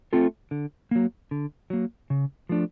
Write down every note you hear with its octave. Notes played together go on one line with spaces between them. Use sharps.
A3 C4 F4 A4
D3
F#3 A#3
D3
F#3 A#3
C#3
F3 A3 D4